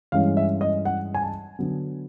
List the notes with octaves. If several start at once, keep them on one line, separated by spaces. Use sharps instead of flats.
G2 E3 G#3 C#4 F5
E5
D#5
F#5
G#5
A5
D3 F#3 B3